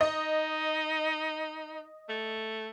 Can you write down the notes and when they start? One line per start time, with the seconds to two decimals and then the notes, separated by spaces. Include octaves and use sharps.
0.01 D#4 D#5
2.09 A3